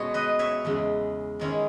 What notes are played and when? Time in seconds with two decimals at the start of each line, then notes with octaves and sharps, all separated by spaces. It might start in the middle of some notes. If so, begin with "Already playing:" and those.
Already playing: B2 G#3 B3 C#4 C#5
0.14 B4 D#5
0.39 C#5 E5
0.65 E2 C#3 G#3
1.39 D#3 G#3 C#4 E4